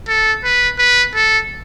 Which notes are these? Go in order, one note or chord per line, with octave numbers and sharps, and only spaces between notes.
A4
B4
B4
A4